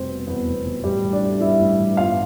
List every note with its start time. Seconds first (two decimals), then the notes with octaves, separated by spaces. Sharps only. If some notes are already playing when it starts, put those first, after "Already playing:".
Already playing: F1 B2 G3 C4 C5
0.09 B3
0.27 E2 B3 B4
0.47 F1
0.66 B2
0.84 A1 G3 G4
1.03 E3
1.12 D4 D5
1.23 A3
1.41 G2 E4 E5
1.61 A1
1.80 E3
1.97 G1 F4 F5